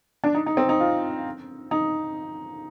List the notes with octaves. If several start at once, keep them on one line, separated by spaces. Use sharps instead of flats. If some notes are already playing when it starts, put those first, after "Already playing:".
D4
D#4
D#4
C4
D#4
F4
D#4